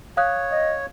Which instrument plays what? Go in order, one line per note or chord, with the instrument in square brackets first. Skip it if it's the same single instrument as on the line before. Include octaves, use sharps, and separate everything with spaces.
[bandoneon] C#5 [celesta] F5 D#6 F#6
[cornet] D#5